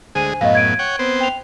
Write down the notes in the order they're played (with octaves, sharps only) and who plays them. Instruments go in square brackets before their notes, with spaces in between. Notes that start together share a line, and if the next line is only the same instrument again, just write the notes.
[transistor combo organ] D2 G#3 G#4 [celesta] C5 G#5 D#7
[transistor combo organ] F#2 A2 B3 [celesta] D#5 F5
[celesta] G#6 D7 D#7
[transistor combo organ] C#5 F#5 G5
B3 C4 C5
[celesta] G5 F7